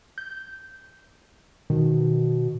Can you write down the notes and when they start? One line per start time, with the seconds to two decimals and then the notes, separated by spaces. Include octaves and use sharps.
0.18 G6
1.70 B2 D#3